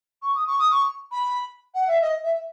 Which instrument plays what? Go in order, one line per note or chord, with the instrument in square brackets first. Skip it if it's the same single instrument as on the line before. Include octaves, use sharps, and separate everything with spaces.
[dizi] C#6
D#6
C#6
D#6
C#6
B5
F#5
E5
D#5
E5